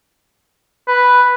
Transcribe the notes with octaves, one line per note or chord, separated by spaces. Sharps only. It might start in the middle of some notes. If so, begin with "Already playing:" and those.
B4